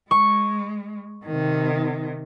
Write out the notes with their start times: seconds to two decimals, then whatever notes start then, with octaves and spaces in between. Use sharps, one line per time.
0.11 G#3 C#6
1.26 C3 D#3